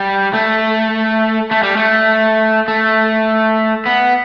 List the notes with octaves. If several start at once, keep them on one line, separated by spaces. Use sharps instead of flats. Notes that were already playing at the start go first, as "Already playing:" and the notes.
Already playing: G3
A3
A3
G3
A3
A3
B3